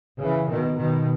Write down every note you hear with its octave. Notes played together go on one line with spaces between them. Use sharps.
C#3 E3
B2 D#3
B2 D#3